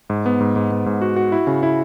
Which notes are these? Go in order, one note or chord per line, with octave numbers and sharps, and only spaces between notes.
G#2
B3
G#2
G#2
B3
G#2
F#4
F#4
E4
C#3
E4